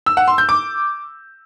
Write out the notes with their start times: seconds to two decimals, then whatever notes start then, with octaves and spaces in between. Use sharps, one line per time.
0.06 E6
0.17 F#5
0.28 C6
0.38 G6
0.49 D6